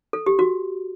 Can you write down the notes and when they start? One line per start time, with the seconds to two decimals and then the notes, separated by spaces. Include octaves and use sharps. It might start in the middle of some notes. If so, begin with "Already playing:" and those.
0.13 A4
0.26 G4
0.39 F#4